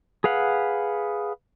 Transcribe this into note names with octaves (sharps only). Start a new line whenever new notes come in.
G#4 B4 F5 F#5